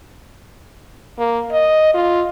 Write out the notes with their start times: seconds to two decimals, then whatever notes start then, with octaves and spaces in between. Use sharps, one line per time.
1.19 A#3
1.52 D#5
1.94 F4